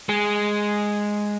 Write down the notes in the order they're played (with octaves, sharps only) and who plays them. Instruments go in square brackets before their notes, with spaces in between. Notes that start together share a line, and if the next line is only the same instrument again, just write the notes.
[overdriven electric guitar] G#3